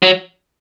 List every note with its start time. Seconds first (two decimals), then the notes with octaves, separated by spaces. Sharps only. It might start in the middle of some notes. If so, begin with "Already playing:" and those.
0.03 F#3